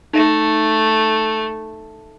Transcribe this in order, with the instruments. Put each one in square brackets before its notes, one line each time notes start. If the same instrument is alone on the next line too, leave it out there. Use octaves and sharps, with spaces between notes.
[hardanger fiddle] A3 [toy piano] D#4 E5